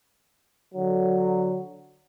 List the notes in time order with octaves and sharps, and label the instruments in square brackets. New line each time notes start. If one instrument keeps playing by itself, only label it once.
[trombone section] D3 F#3